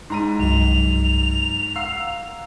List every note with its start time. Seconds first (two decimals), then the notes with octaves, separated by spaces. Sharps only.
0.10 G#2 A#5 C6 D#7
0.39 C2 G2 F#3 F7
1.76 F5 F#5 A#5 E6 C7